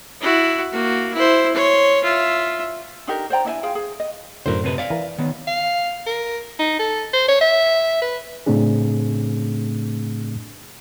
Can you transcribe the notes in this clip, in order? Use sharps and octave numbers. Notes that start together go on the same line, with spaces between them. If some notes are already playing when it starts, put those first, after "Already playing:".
E4 F#4
A#3 F#4
E4 C5
C#5 C6
F4 E5
D4 D#4 G4 A#4
C5 D5 G5 A#5
D4 E4 E5 G#5
F4 G#4 F5 G5
G#4
D#5
F#2 A2 D3 A#4 C5
C3 C4 B4
D5 F5
E3 A#4
D#3 B3
F5
A#4
D#4
A4
C5
C#5
E5
B4
A2 C#3 A3 C4 D4 G#4